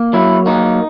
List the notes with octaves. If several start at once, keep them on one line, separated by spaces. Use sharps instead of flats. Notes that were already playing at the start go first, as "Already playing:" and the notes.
Already playing: A#3
F#3 E4
A#3 D#4